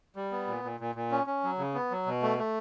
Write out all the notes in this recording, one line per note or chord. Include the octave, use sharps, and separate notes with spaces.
G3
B3
A#2
A#2
A#2
A#2
C#4
C#4
F#3
C#3
B3
F#3
B2
A3
A3